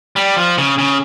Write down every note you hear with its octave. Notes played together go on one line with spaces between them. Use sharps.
G3
F3
C#3
C#3